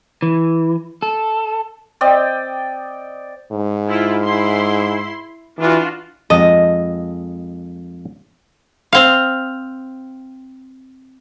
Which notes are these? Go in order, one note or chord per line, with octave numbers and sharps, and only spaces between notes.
E3
A4
C4 D5 D#5 G5
G#2
E4 F4
E4 C6
E3 D4 F4 F#4
F2 G#3 D#5 A5
C4 F5